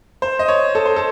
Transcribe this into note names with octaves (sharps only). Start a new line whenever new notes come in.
C5
D#5
C#5
A4
C5
A4